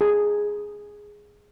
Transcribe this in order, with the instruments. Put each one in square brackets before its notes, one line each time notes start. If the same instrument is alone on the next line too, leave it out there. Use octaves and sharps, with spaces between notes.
[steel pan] G#4